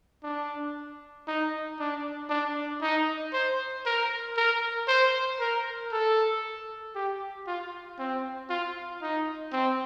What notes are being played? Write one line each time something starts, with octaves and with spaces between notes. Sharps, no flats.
D4
D#4
D4
D4
D#4
C5
A#4
A#4
C5
A#4
A4
G4
F4
C4
F4
D#4
C4